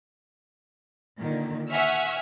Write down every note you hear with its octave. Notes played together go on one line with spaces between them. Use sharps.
A#2 D3 D#3
E5 F#5 G#5 C#6 E6 F6